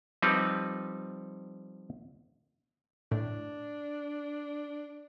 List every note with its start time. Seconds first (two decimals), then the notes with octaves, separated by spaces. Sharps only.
0.22 F3 G3 C4 D#4 B4
3.12 A2 D4